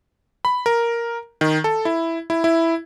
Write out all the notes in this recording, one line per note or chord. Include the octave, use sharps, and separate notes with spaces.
B5
A#4
D#3
A4
E4
E4
E4